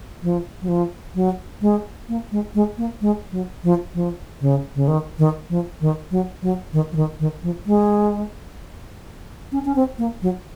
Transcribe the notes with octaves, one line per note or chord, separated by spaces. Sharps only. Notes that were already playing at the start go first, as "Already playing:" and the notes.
F3
F#3
F3
F#3
G#3
A#3
G#3
G#3
A#3
G#3
F#3
F3
F3
C#3
C#3
D#3
D#3
F3
D#3
F#3
F#3
D#3
F3
D#3
D#3
F3
G#3
C#4
C#4
C4
A#3
F#3